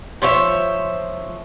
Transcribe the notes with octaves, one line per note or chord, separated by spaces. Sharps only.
F3 C5 C#5 E5